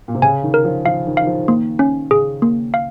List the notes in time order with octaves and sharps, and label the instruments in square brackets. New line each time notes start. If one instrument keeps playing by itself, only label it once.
[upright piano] A#2
C3
[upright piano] C#3 [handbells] G#5
[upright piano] D#3
[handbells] A#4
[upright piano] F3
[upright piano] F3 [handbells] F5
[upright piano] D#3
[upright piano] D#3 [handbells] F5
[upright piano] F3
[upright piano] D#3 [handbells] A#3
[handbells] C#4
[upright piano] C#3 [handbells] G#4
[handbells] A#3
F5